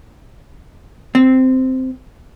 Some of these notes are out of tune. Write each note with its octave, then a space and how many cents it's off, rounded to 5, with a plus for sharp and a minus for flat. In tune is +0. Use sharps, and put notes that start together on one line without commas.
C4 -10